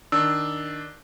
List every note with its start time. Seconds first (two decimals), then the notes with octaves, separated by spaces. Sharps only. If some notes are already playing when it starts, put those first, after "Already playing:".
0.12 D#3 D4 E6